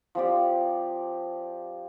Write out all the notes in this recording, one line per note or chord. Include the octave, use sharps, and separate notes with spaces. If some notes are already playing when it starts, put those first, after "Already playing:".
F3 C4 G4 D5